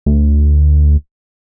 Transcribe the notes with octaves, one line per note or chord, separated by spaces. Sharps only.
D2